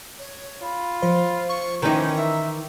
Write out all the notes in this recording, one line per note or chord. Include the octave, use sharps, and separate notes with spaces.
C#5
F4 B5
F3 C5
C#6
D#3 E3 C#4 D#4 A#5
E5